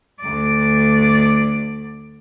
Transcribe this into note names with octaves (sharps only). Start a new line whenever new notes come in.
D2 D5